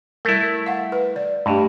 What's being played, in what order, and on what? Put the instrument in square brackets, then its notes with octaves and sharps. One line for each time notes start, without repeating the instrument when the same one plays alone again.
[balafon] G3 A#4 [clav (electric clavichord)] A3 E4
[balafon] F5 F#5
B4
D5
[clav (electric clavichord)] G2 [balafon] A3 D4 G4